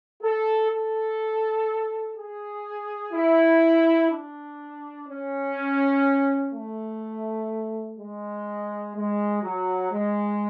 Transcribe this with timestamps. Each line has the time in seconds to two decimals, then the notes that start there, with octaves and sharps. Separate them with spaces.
0.23 A4
0.72 A4
2.16 G#4
3.13 E4
4.11 D4
5.07 C#4
6.53 A3
7.99 G#3
8.95 G#3
9.43 F#3
9.92 G#3